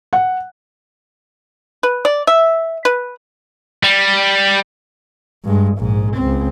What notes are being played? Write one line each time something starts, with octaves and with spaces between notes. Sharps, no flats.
F#5
B4
D5
E5
B4
G3
G2 G#3
A#1 G#2
C#2 C4